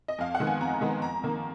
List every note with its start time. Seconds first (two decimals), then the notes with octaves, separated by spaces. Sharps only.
0.08 D#5
0.18 F2 F5
0.35 F#5
0.40 D#3 G#3 B3
0.47 G#5
0.61 F2 A#5
0.81 D#3 G#3 B3
1.02 F2 A#5
1.24 D#3 A#3